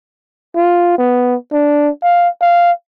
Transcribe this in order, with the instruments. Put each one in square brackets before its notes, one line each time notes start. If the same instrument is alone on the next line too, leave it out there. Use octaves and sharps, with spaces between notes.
[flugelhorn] F4
B3
D4
F5
F5